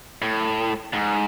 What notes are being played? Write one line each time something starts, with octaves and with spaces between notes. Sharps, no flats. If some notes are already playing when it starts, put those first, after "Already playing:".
A2
G#2